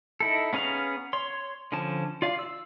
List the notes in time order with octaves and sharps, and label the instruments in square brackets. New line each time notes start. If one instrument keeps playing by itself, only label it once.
[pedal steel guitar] D#4 E4 A4
B3 C#4 G#4 F5 A#5
C#5 C6
D3 F3 C#4 A5
F4 D5 F5
E6